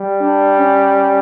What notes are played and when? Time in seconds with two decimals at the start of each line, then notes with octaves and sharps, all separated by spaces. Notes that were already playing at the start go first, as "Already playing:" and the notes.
Already playing: G3
0.21 D4
0.59 C#4